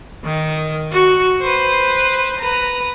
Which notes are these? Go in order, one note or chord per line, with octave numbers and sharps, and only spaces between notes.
D#3
F#4
B4 C5
B4 A#5